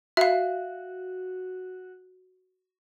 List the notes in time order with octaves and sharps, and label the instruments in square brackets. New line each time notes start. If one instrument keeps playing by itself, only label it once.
[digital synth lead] F#4 [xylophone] E5 F5